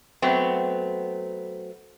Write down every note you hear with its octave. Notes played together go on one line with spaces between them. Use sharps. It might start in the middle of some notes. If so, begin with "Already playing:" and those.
F#3 A3 B3 C4